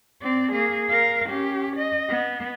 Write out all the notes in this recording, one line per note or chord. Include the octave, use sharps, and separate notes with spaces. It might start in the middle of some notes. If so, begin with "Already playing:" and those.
C4 D5
A#3 G#4
A#4 F5
C#4 G4
D#5
B3